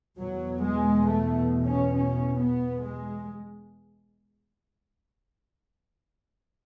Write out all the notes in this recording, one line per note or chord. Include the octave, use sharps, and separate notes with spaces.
E2 B2 F#3
G#3
A3
C#4
C#4
B3
G#3